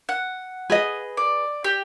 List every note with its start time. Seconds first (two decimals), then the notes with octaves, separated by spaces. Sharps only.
0.09 F#5
0.70 G#4 B4 D#5
1.17 D5
1.64 G4